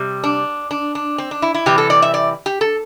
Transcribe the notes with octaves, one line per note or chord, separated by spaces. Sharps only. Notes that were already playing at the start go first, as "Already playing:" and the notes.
Already playing: C3 G3
D4
D4
D4
C4
D4
E4
E4
C3 E3 G3 G4
A4
D5
E5
D5
G4
A4